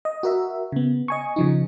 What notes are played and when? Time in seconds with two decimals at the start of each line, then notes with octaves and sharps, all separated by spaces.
0.05 D#5
0.23 F#4 A#4 E5
0.72 C#3 B3
1.08 D#5 G#5 C#6
1.36 C#3 F3 D#4